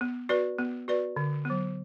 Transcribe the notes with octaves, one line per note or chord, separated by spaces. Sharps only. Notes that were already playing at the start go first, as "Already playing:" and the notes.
B3
F#4 B4 D5
B3
F#4 B4 D5
D3
F#3 B3